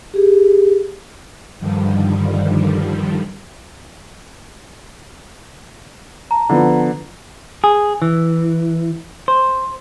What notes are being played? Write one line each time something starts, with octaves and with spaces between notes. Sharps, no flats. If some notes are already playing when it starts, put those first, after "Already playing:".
G4 G#4
G2 D3 D#3 F3 G3
A5 A#5
D3 F3 B3
G#4
E3
C5